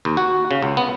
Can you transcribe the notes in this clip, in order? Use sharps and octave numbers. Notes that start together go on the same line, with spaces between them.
D#2
F#4
C#3
C#2
B3